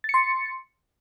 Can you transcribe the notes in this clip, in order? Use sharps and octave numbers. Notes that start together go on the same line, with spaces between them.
C6 A6 C#7